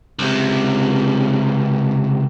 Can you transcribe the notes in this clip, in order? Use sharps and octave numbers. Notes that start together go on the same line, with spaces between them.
C#2 C3